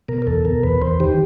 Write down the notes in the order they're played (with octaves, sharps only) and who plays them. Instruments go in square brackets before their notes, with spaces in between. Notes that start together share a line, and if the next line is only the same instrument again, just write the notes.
[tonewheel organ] B2 A#4
A#4
E2 A4
B2 A#4
E2 B4
E2 C5
D#3 G4